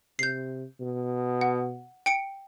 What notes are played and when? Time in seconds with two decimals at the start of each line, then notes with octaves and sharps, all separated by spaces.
0.19 C3 G6 C7
0.80 B2
1.41 F#5
2.06 G5 C#7 D7